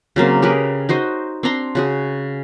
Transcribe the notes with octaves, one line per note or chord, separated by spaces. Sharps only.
C#3 F#3 A#3 C4
G4 G#4 A#4 B4
D#4 F#4 C5 D#5
C4 D4 A#5 C6
C#3 F#4 G#4